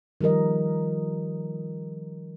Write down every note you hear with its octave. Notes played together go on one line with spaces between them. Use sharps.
D#3 F3 G3 A#4 D#5